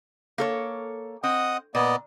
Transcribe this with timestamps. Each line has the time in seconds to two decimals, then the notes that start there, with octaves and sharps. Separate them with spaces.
0.38 A#3 A4 C#5
1.24 C4 D#5 F#5 D#6
1.75 A#2 B3 D5 D#5